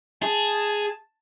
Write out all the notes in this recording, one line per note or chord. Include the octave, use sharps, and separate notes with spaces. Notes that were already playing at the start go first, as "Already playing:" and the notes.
G#4 A5